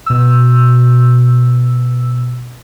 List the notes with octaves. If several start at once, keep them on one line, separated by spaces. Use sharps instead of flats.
B2 E6